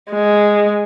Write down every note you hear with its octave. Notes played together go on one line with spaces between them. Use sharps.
G#3